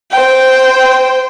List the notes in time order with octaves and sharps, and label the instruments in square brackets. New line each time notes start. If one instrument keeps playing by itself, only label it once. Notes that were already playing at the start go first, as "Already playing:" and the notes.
[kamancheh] C5 G5